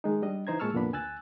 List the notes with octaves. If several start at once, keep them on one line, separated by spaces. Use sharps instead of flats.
D#3 G#3 D#4
G3 D4 D#5
E3 D#4 C5 A#5 G#6
A#2 G#3 A5 C#6 E6 F6
C2 F2 A#2 B3 D4 B5
D2 G#5 E6 F#6 A6